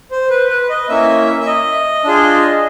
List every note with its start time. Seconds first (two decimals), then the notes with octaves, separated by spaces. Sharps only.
0.11 C5
0.30 B4
0.50 B4
0.70 D#5
0.89 A#3 C#4 E4 E5
1.40 E5
1.46 D#5
2.04 D4 F4 G#4